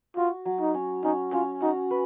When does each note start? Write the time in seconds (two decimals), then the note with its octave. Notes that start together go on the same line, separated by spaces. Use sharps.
0.17 F4 F#4
0.45 F#3
0.60 D#4
0.74 C#4
1.04 C#4 D#4
1.32 C#4 F4
1.62 D#4 F#4
1.91 B4